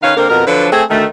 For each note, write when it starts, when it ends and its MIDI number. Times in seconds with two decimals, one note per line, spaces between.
0.03 0.14 51
0.03 0.14 61
0.03 0.14 71
0.03 0.14 77
0.17 0.28 50
0.17 0.28 58
0.17 0.28 60
0.17 0.28 70
0.29 0.44 41
0.29 0.44 47
0.29 0.44 70
0.47 0.67 50
0.47 0.67 53
0.47 0.67 54
0.47 0.67 62
0.47 0.67 71
0.72 0.83 57
0.72 0.83 60
0.72 0.83 68
0.91 1.05 38
0.91 1.05 51
0.91 1.05 57